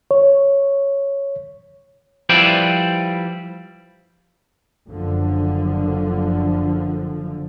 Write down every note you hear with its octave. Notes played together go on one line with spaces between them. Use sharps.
C#5
F3 G3 E4 B4 C5 D5
F#1 F#2 D3 F3